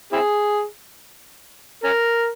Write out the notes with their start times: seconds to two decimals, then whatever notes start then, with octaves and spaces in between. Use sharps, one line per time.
0.13 C4 E4 G#4
1.84 C#4 A#4